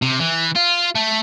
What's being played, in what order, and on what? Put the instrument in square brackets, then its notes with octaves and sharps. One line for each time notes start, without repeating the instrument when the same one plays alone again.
[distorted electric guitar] C3
E3
F4
A3